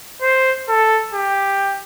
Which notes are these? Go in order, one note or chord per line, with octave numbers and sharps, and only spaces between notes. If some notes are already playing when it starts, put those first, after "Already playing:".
C5
A4
G4